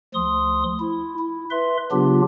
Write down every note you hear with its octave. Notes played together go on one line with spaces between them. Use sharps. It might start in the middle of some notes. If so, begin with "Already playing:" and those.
D2 F3 C6 D#6
E4
E4
B4 E5 C6
C#3 F#3 B3 D4 F4 G4